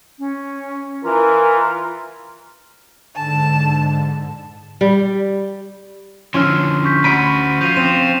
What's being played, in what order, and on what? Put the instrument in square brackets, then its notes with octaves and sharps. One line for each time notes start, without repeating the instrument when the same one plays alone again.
[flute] C#4
[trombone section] E3 [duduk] F4 [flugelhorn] A#4 [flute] A#5
[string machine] G#2 D3 [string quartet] A5
[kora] G3
[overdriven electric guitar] D3 F3 [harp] C#4 E4 [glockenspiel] C6 F6
[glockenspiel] C#6 G6 B6
[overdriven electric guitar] D2 F#4 [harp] B5 B6 D7 [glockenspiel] D#7
[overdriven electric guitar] F3 F4 [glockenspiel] G6 D#7 F7
[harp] C4 [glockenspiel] E7